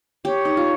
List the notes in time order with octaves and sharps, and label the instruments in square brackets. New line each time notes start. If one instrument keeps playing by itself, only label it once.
[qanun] G4 [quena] C#5
[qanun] D#4
F4